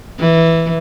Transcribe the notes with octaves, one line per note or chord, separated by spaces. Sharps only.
E3